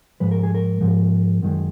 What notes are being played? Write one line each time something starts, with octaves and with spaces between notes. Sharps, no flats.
G#2 F3 G#3 B4
A#4
G#4
A#4
G#2 F3 G#3
F#2 D#3 G#3